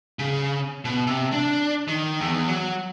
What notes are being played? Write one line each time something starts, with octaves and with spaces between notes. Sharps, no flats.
C#3
B2
C3
D4
D#3
E2
F#3